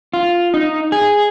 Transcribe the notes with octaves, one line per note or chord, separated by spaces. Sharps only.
F4
D#4
G#4